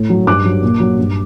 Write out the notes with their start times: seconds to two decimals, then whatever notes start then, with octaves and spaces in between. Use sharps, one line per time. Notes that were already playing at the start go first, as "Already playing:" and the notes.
Already playing: A2
0.10 F#3
0.27 G2 D6 F#6
0.45 F#3
0.62 A#2
0.80 F#3
0.98 G2